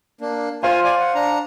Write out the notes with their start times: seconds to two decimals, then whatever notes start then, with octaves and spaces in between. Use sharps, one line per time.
0.21 A#3 D4
0.63 F4 C5 F5 G#5 C6
0.84 D5 G#5
1.00 F#5
1.15 D4 A#5